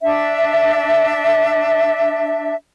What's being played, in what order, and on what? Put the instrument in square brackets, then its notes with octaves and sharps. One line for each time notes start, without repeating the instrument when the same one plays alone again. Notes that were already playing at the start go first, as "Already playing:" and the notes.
[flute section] D4 E5